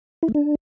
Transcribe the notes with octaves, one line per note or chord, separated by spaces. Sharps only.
E4
A3
D4